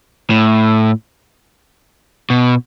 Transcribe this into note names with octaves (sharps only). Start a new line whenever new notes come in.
A2
B2